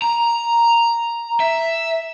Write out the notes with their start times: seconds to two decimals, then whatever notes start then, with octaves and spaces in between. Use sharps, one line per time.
0.02 A#5
1.40 E5